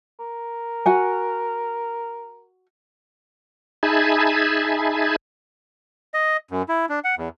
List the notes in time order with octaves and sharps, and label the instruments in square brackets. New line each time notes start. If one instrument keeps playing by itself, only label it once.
[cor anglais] A#4
[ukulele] F#4 F#5 G#5
[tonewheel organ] D#4 G#4 E5 G#5 A5 B5
[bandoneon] D#5
F#2
E4
D4
F#5
E2